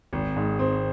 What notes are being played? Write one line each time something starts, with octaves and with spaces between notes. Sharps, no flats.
G#1
G#2
C4